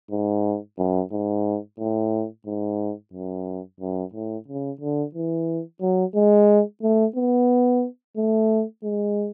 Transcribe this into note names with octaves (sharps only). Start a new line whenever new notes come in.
G#2
F#2
G#2
A2
G#2
F#2
F#2
A2
C#3
D3
E3
F#3
G#3
A3
B3
A3
G#3